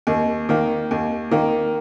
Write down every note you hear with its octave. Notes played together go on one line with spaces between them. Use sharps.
D#2
D#3 A#3
D#2
D#3 A#3